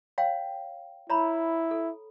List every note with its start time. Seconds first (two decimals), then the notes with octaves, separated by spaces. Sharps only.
0.18 C#5 F5 G5
1.10 E4 C#5 A#5 B5
1.71 A4